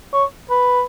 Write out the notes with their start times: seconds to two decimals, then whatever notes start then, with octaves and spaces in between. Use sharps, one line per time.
0.13 C#5
0.50 B4